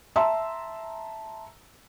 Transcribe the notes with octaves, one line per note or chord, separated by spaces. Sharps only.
E5 A5 A#5 C6 E6